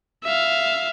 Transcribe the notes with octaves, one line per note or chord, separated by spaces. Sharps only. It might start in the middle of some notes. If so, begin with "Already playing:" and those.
E5 F5